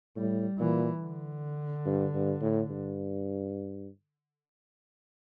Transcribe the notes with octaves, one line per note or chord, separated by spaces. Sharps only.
A2 G3
A#2 E3
D3
G2
G2
A2
G2